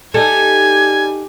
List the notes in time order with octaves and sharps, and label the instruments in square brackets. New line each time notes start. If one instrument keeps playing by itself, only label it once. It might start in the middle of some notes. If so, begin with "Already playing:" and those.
[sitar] G3 [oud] D#4 A4 [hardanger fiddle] G#5 [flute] G#6